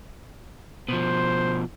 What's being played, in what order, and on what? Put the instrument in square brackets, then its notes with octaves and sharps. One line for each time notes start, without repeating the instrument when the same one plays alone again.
[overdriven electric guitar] B2 F3 [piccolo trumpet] C5